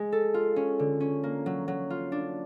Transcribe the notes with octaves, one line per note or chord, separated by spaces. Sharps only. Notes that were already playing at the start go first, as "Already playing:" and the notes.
Already playing: G#3
A4
F4
C#4
D3
C#4
A#3
F#3
F#3
F4
D4